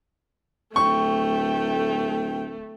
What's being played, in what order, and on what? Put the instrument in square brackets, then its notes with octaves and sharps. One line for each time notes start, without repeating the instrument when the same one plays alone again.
[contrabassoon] D1 [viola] A3 [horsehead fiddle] G5 [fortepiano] C#6